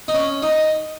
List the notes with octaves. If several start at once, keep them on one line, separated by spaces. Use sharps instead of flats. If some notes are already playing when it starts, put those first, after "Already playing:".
D#4
C#4
D#4